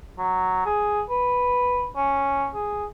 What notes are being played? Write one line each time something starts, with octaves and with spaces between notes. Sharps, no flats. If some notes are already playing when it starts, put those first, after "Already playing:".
F#3
G#4
B4
C#4
G#4